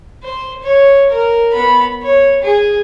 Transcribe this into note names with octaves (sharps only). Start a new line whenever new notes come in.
C5
C#5
A#4
B3 B5
C#5
G#4